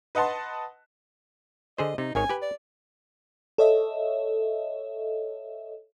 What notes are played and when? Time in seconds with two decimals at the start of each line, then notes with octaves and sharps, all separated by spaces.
0.15 B4 D#5 F#5 A5 C6
1.78 D3 G#4 C5 D#5
1.98 C3 D#4
2.15 G#1 D#3 C#5 G#5
2.29 G4 B4
2.42 D5
3.58 A4 C#5 D#5 E5